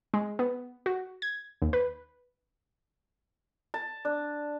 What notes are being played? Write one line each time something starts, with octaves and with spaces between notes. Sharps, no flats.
G#3
B3
F#4
G#6
D#2
B4
A5
D4